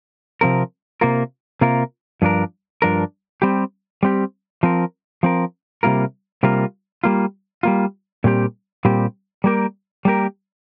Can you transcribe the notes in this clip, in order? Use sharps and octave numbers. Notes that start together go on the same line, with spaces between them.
C3 F3 C4 A#4
C3 A#3 F4 A#4
C3 A#3 F4 A#4
G2 F3 D4 A#4
G2 F3 D4 A#4
G3 C4 G4
G3 C4 G4
F3 C4 A#4
F3 C4 A#4
C3 G3 A#3 F4 A#4
C3 G3 A#3 F4 A#4
G3 A#3 F4
G3 A#3 F4
A#2 G3 C4 G4
A#2 G3 C4 G4
G3 A#3 G4 A#4
G3 A#3 G4 A#4